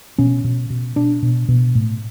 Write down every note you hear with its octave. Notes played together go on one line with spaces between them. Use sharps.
B2 C#4
B2
B2
B2 D4
B2
B2
A2